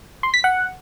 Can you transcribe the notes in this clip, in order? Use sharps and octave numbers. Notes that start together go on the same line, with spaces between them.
C6
B6
F#5